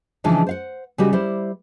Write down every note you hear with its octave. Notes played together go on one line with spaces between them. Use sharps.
C#3 E3 F3 G#3 D4 D#4
C5 F5 F#5
C#3 G3 F#4 G4 D#5
G3 E4 C5